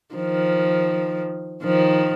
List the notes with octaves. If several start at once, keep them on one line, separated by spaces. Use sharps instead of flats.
D#3 F3
D#3 F3